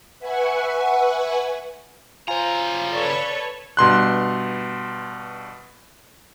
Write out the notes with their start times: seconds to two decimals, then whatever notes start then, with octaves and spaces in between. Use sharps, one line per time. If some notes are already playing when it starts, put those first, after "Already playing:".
0.19 B4 E5 F#5 G#5 C#6
2.28 C#3 F4 C5 G#5 A#5
2.93 A4 B4 C#5 D5 C#6
3.77 G2 B2 C6 F#6